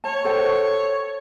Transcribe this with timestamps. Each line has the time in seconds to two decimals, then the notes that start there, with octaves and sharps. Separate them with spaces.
0.04 C#5 A5
0.24 A4 C5 G5